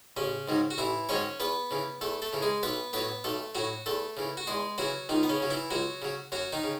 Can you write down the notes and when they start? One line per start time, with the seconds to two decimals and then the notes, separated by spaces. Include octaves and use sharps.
0.17 A1 C#3 C#4
0.48 G#2 D#3 F#3
0.71 F#4
0.78 A1 E3 E4
1.09 G#2 D#3 F#3 C#4 C#5
1.40 E2 B3 B4
1.71 C#3 E3
2.01 E2 A3 A4
2.22 A3 A4
2.33 C#3 E3
2.42 G#3 G#4
2.63 B1 B3 B4
2.93 A2 F#3 B3 B4
3.24 B1 A3 A4
3.55 A2 F#3 F#4
3.86 E2 A3 A4
4.17 C#3 E3
4.37 F#4
4.47 E2 G#3 G#4
4.78 C#3 E3 F#3 F#4
5.09 C#2 D#3 D#4
5.23 B3
5.29 C#3 C#4
5.40 C#3 F#3
5.50 E3 E4
5.71 C#2 F#3 F#4
6.02 C#3 F#3
6.32 F#2 F#3 F#4
6.53 D#3 D#4
6.64 C#3